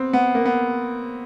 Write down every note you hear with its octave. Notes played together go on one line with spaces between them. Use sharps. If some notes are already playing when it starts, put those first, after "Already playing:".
Already playing: B3 C4
B3
A#3
B3